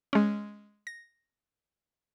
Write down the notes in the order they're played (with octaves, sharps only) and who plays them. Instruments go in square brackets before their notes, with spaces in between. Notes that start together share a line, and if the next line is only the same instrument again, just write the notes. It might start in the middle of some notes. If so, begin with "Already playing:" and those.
[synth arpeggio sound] G#3 C#4
A#6